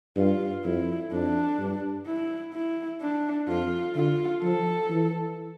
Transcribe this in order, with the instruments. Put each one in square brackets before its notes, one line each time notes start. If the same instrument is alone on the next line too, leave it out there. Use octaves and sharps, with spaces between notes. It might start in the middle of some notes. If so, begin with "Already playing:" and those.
[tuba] G2 [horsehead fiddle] F4
[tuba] F2 [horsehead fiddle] E4
[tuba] F2 [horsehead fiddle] D4
[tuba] G2
[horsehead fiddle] E4
E4
D4
[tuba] F2 [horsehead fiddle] F4
[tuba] D3 [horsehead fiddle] F4
[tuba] F3 [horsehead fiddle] A4
[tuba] E3